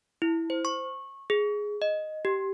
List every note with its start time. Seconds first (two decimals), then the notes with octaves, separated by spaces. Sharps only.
0.22 E4
0.50 C5
0.65 C#6
1.30 G#4
1.82 D#5
2.25 G4